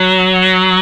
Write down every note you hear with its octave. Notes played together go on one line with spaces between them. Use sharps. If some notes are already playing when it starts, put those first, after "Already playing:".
Already playing: F#3